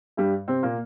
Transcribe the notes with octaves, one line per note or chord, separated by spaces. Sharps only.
G2 G3
C3 C4
A#2 A#3